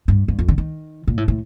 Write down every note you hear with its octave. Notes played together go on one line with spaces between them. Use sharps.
G2
G2
F2
D3
D#3
A#2
A2
A2